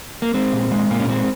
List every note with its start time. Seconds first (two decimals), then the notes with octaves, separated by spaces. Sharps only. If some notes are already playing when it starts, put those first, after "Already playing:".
0.22 A#3
0.34 G#3 C4
0.53 A#2
0.72 G#3
0.90 A#2 A#3
1.00 C#4
1.09 G#3 C4